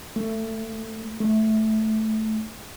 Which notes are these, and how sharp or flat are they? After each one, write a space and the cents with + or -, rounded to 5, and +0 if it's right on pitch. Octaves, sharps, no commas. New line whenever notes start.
A3 +20
A3 -10